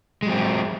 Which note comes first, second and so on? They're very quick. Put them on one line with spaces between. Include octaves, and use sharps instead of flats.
G#3 F#3 C4